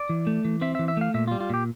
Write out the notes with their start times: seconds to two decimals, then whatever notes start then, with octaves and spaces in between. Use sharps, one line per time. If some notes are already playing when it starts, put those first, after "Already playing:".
Already playing: D5
0.09 E3
0.27 A3
0.45 E3
0.62 C4 E5
0.75 E5
0.79 E3
0.88 E5
0.97 A3 F5
1.14 A#2 E5
1.28 G3 F4
1.40 F4
1.50 A#2 G4